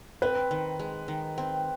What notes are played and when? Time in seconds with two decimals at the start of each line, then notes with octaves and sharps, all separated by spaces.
0.22 C4 B4
0.51 D#3
0.79 G#3
1.08 D#3
1.38 C4